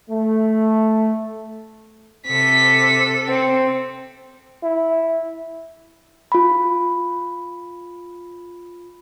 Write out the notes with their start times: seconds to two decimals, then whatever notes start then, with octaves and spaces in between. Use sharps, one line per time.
0.10 A3
2.28 C3 A4 B6
3.28 C4
4.63 E4
6.32 F4 B5